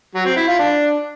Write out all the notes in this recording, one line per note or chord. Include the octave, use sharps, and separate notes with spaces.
F#3
C4
E4
F4
D4